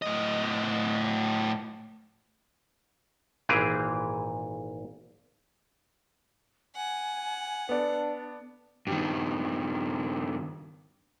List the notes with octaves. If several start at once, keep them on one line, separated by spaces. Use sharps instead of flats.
A2 D#5
G#1 A#2 E3 C4 G4 G#4
F#5 G#5
B3 D4 A4 D5
G2 D#3